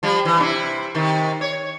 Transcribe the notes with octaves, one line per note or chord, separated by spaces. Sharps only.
F3 G3
E3
C3 D4 E4
C3 D#3
C#5